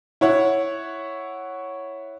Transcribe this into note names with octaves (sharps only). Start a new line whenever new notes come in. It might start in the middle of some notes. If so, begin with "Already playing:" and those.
E4 C#5 F#5